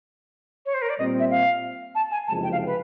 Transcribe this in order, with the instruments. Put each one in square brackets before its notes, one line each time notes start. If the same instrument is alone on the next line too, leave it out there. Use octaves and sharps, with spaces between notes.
[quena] C#5
C5
A#4
D5
[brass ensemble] A#2 G3 C4 [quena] D#5
[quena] E5
F5
A5
G#5
[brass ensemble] F#1 F2 C3 F3 G#3 [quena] A5
[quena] G5
F5
B4